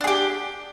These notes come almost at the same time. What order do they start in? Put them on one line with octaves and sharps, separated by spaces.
D4 G#4 G4